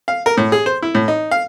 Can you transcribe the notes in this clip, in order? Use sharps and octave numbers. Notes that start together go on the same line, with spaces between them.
F5
A#4
A2
G#4
C5
E4
A2
D#4
F5